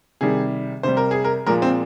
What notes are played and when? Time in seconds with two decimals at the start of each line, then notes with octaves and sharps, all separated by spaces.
0.21 C3 D#3 G3 G#4
0.83 C3 G3 C5
0.97 A#4
1.11 G#4
1.25 A#4
1.46 A#2 F3 G#3 A#4
1.62 C4